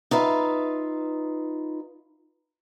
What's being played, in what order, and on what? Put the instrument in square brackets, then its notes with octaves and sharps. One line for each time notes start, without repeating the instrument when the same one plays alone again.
[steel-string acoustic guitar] D#4 F4 B4 E5